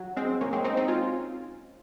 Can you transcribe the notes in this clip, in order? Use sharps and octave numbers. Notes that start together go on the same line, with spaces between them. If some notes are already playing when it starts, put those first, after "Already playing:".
Already playing: F#3
G#3 C4
A#3 C#4
G#3 C4
C4 D#4
C4 D#4
C#4 F4